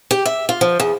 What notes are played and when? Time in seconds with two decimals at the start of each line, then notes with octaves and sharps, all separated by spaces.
0.11 G4
0.26 E5
0.49 F4
0.61 F3
0.80 E2